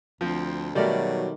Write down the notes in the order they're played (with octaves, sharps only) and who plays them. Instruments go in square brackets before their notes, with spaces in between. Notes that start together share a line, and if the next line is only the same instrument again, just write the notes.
[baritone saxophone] D2 [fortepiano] F3 C4
[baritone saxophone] B2 [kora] D#3 A3 A#4 [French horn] F#3 [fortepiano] G3 D5